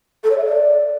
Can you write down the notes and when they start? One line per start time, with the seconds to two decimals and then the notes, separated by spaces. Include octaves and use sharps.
0.24 A4
0.31 C#5
0.38 E5
0.45 D5